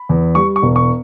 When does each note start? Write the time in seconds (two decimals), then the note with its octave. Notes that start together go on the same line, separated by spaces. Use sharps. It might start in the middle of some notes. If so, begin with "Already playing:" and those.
Already playing: B5
0.09 E2
0.35 G3 C#6
0.56 C#6
0.62 E1
0.76 C#6